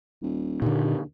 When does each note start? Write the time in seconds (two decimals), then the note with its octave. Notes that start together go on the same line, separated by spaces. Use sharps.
0.22 D#1
0.62 D#2 A#2 D3